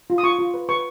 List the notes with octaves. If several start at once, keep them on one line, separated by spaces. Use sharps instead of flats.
F4
D#6
F4 C#6
F4
B4
B4 C#6